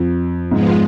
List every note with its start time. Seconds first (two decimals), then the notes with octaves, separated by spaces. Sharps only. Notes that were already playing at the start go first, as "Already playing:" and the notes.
Already playing: F2
0.51 G#2 F3 G#3 B3 F4